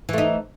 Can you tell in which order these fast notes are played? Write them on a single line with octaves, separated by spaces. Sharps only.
E3 A3 D#4